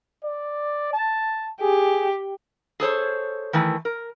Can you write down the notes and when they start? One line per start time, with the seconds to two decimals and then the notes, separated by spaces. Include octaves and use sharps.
0.24 D5
0.93 A5
1.61 G4 G#4
2.80 G#4 A4 C5 C#5
3.53 D#3 E3 A3
3.85 A#4